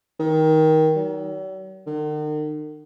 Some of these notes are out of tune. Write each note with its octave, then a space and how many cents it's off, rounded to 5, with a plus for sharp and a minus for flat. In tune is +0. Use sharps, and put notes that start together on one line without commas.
D#3 +15
F#3 +45
D#3 -45